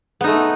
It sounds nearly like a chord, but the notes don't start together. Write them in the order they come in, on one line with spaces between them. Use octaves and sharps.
B3 D#4 A3